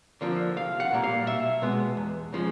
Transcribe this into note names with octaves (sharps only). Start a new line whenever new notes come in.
D3 F3 A#3 D4
C2 F5
F#5
A#2 G3 A#3
F5
B1 E5
B2 G#3 B3
E2
C#3 F3 G#3